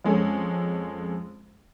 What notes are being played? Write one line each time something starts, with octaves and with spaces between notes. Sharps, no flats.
F2 G#3 C#4 A4